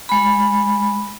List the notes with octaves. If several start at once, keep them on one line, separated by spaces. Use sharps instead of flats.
G#3 B5